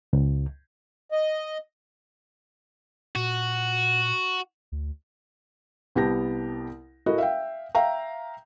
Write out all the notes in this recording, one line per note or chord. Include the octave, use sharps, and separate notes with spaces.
C#2
D#5
A#2 F#4
D2
C2 B3 G4 A5 A#6
E4 F#4 A4 A#4 D#5
E5 F5 G5
E5 F5 G5 A#5